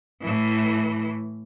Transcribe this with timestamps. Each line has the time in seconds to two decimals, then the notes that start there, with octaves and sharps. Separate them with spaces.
0.22 A2 E3